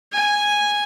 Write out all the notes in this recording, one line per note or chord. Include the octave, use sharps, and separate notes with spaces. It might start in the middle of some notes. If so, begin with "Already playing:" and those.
G#5